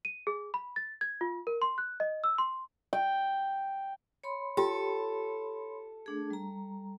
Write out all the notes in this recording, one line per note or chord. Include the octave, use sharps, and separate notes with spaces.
D#7
G#4
B5
A6
G#6
F4
A#4
C6
F#6
D#5
E6
C6
G5
C#5 B5 C6
F4 G4 A4 G5
A3 D4 G#4
G3 A#5